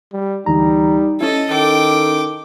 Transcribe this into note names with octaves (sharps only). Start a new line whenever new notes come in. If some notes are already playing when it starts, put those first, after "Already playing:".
G3
D2 E3 G3 D#4 A#5
C#4 E4 A4 D#5
D#3 A4 G5 D6